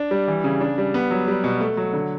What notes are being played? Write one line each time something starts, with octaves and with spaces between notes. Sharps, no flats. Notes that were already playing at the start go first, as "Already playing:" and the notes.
Already playing: D4
G3
E3
C#3
D4
G3
B3
F#3
G3
B2
A3
F#3
D3